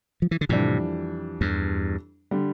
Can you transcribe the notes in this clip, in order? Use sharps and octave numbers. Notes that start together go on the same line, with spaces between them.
F3
E3
D3
F2 A2 C3 E3 G3 D4
E2 G2
D3 G3